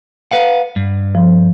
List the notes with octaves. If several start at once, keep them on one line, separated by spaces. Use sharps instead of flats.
B4 F5 F#5
G2
F3